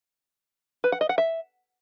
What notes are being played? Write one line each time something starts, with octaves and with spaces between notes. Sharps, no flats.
B4
F#5
D#5
F#5
E5